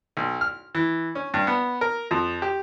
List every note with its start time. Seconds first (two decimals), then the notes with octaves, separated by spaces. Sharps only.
0.17 B1
0.41 F6
0.75 E3
1.15 C#4
1.34 G2
1.47 B3
1.81 A#4
2.11 F2
2.42 G4